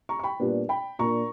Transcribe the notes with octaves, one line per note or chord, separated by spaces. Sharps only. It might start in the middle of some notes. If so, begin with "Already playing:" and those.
A#5 C#6
C#6
G5 B5
A#2 G3 B3 D4
G5 B5
A#2 A#3 D4 A#5 C#6